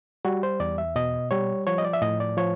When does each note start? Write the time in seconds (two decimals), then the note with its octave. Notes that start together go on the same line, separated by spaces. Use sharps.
0.25 G3 F#4
0.43 C5
0.60 E2 D5
0.78 E5
0.96 B2 D#5
1.31 G3 C#5
1.67 F3 C#5
1.78 D#5
1.85 D5
1.93 E5
2.02 A2 D#5
2.20 D5
2.37 F3 C#5